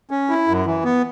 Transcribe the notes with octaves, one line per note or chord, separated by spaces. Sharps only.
C#4
E4
F#2
E3
B3